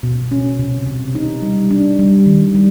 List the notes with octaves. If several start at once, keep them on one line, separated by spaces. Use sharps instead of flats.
B2
C#4
C3
C3
D#4
G3
D4
G3
D#3
G3